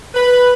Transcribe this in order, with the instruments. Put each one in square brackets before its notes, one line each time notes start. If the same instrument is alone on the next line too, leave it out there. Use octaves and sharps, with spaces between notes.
[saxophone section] B4